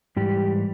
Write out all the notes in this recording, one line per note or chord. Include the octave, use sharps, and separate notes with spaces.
G#2 E3 G3 G4